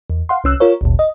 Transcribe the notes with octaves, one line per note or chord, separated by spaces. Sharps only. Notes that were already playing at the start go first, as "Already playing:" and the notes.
E2
F5 F#5 C6
C2 C#4 E6 F#6
F4 A#4 C#5
G1 D2 A#2
D#5